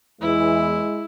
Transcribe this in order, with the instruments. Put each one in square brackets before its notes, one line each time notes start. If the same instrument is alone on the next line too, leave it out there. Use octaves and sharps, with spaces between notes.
[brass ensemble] E2 E3 [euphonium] G#3 [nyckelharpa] E4